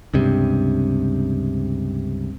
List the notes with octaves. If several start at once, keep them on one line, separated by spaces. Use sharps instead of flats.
C#2 G2 C3